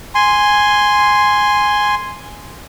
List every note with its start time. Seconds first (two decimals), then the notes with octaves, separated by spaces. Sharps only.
0.15 G#5 C6